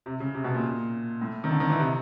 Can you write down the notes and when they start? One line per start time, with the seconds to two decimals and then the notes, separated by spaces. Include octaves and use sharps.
0.06 C3
0.20 C#3
0.35 C3
0.44 B2
0.54 A#2
1.22 A2
1.44 D#3
1.51 D3
1.60 D#3
1.70 E3
1.80 C3